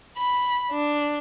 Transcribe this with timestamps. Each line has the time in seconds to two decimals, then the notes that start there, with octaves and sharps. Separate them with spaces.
0.18 B5
0.72 D4